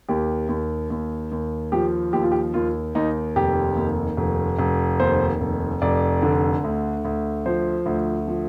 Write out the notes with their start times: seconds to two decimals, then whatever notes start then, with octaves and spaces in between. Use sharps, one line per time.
0.08 D#2 G4
0.49 D#2
0.90 D#2
1.32 D#2
1.72 F3 G4
2.13 D#2 G4
2.23 F4
2.32 G4
2.54 D#2 F4
2.95 D#2 D#4
3.36 F1 G4
3.77 D#2
4.17 F1
4.59 F1
5.00 D#2 C5
5.41 F1
5.82 F1 D5
6.22 D3
6.64 D2
7.05 D2
7.46 F3 C5
7.86 D2
8.27 F3